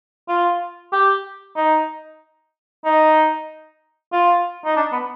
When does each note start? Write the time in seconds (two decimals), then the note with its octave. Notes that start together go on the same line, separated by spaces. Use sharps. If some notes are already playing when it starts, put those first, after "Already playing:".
0.29 F4
0.93 G4
1.56 D#4
2.85 D#4
4.13 F4
4.65 D#4
4.77 D4
4.92 B3